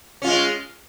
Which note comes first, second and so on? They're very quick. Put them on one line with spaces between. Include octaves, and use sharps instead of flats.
C#4 F4 G#3